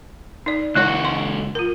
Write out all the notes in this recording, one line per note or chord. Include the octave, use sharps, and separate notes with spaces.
D#4 D5
C#2 G#3 E4 F#4 C#5
C6
F4 A#4